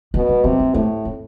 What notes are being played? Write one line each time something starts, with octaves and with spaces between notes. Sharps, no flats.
B2 B3
G3
C3 F#3
F#3
A2 A3
C4